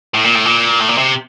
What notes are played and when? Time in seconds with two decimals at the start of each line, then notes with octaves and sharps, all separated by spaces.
0.14 A2
0.24 A#2
0.35 A2
0.46 A#2
0.80 A2
0.89 A#2
0.98 C3